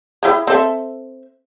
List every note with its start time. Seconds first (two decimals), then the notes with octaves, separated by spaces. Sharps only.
0.23 E4 G4 G#4
0.47 C4 A4 E5